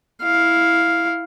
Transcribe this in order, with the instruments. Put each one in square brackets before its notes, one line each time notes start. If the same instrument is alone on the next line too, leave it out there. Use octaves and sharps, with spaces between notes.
[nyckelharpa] E4 F5